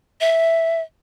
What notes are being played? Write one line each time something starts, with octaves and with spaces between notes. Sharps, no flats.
E5